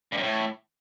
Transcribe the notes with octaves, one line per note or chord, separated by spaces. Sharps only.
G2
F#2
A2